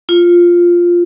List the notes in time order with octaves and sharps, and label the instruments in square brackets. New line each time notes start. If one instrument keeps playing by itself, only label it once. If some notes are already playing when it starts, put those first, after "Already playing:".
[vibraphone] F4